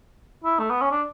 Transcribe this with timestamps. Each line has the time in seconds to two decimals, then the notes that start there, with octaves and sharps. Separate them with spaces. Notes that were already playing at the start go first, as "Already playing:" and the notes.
0.44 E4
0.59 A3
0.70 B3
0.81 C#4
0.91 D4